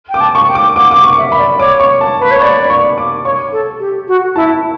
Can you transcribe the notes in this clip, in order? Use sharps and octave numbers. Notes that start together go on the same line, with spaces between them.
G5 D6
A5
C#6
G5
D6
F#5 D6
D6
F#5
C#6
E5
E5 B5
D5
C#5 D6
C#6
A5
B4 B5
C#5 C#6
D5 B5
C#6
D6
C#5 C#6
A4
G4
F#4
E4 A5